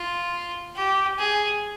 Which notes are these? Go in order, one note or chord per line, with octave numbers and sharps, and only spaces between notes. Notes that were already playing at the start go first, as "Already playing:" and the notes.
Already playing: F4
G4
G#4